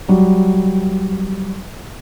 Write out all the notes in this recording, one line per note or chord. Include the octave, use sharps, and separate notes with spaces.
F#3 G3